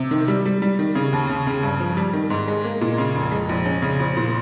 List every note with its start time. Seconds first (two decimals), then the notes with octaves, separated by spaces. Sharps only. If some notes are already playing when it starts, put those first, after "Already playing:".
Already playing: C3
0.11 D#3
0.28 G3
0.45 G3
0.62 G3
0.79 D#3
0.95 C#3
1.13 D#2
1.30 C#3
1.47 C#3
1.63 G2
1.80 F3
1.97 G3
2.13 D#3
2.30 G#2
2.48 G#3
2.64 A#3
2.81 A#2
2.98 C#3
3.15 F1
3.31 G#3
3.49 A#1
3.66 C#4
3.82 C#3
4.00 A#1
4.17 A#2